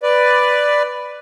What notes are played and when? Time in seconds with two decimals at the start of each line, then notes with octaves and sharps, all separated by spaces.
0.03 B4 D5